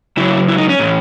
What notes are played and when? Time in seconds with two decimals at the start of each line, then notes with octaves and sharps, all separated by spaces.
0.17 C#3 F#3 E4
0.49 E4
0.58 D#4
0.69 C#4
0.79 A2 E3